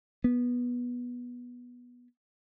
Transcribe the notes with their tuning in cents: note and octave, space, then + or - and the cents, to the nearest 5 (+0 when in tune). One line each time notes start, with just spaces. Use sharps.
B3 -15